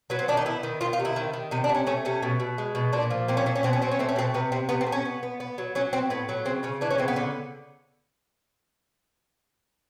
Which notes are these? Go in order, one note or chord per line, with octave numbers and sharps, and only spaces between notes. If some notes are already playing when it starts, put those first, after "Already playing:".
F#3 B3
C4
D#3 D4
D#4
B3 E4
D#3
D#3 F4
F4
C3
E4
D#3
D#3
C3 D#4
D4
A3
C#4
A3 C#4
C3 C#4
B2
B2
G#3
B2
A#2 D4
F3
A#2 C4
C#4
A#2 C4
C#4
B2 C4
C#4
F#3 C4
C#4
A3 C4
C#4
B2 C4
C3 B3
C3 C4
C3 B3
C4
A3
C#4
B3
B3
B3
F#3
F#3 C#4
B3 C4
A2 B3
F#3
C#3 C4
C#3 C#4
E3 D4
C#4
C#3 C4
B3
D3